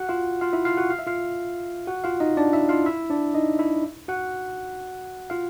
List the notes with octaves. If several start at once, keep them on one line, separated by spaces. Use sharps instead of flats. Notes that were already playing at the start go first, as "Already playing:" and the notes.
Already playing: F#4 F#5
F4 F5
F4 F5
E4 E5
F4 F5
F#4 F#5
F5
E5
F4 F5
F#4 F#5
F4 F5
D#4 D#5
D4 D5
E4 E5
F4 F5
E4 E5
D4 D5
D#4 D#5
E4 E5
F#4 F#5
F4 F5